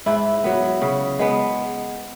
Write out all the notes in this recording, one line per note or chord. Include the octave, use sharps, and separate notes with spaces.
G#2 E4
F#3 B3
C#3
G#3 B3